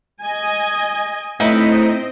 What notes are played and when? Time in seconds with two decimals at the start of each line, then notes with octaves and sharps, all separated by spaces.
0.22 D#5 G#5
1.40 A2 C4 D#4 E4 B4 D#5